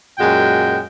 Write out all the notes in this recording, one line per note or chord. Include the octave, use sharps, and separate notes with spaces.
F#2 A#2 G#3 F#4 G5